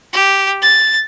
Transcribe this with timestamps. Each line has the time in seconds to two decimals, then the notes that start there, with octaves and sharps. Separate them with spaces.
0.13 G4
0.62 A6